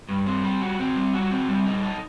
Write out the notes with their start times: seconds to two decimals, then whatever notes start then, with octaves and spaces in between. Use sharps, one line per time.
0.09 G2
0.26 C4
0.43 G3
0.61 F#4
0.79 C4
0.96 G3
1.14 F#4
1.31 C4
1.48 G3
1.66 D#4
1.83 A4